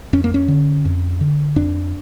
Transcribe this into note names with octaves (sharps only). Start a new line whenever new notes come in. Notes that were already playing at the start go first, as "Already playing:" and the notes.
F2 C#4
A#3
C#4
D3
F2
D3
F2 D4